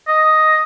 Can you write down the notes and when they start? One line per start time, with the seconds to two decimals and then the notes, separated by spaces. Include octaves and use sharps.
0.07 D#5